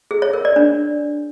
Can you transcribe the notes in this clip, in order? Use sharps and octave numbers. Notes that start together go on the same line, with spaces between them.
G#4
C#5
A#4
D5
D4